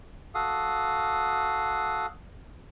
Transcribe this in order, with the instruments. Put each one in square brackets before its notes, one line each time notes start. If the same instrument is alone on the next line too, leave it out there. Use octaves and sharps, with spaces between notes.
[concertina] F#4 A4 F5 D#6